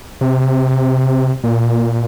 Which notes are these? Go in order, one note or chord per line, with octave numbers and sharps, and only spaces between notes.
C3
A#2